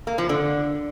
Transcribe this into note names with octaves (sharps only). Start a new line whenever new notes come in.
A#3
F3
D3